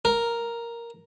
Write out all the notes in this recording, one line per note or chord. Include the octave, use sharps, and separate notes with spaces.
A#4